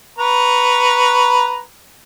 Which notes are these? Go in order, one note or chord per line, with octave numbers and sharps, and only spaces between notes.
B4 A#5 C#6